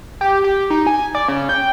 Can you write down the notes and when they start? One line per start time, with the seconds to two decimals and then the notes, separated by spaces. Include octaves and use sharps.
0.21 G4
0.44 G4
0.70 D#4
0.87 G#5
1.15 D5
1.28 C#3
1.49 G5